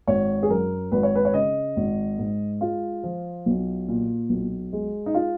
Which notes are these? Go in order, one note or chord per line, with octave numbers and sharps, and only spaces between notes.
G#1 C#5
G#4
F#2 A#4
G#1 B4
C#5
B4
C#5
C#3 D#5
G#1
G#2
G#3 F4
F3
B1
A#2
B1
G#3
D#4
F4